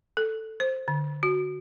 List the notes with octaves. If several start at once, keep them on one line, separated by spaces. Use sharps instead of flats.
A4
C5
D3
F#4